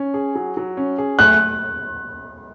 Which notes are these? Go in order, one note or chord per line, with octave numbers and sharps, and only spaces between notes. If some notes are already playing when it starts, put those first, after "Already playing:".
Already playing: C#4
G#4
F#3
F#3
C#4
G#4
A3 F#6